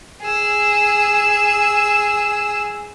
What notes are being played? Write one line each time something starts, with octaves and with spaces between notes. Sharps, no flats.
G#4 E6